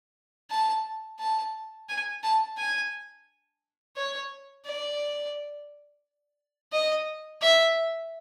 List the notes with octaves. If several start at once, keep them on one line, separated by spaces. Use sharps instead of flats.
A5
A5
G#5
A5
G#5
C#5
D5
D#5
E5